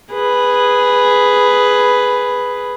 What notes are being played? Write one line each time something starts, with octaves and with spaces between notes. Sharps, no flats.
G#4 B4